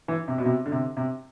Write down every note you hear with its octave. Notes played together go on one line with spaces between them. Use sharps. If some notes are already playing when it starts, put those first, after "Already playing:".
E3
C3
B2
C3
D3
C3
C3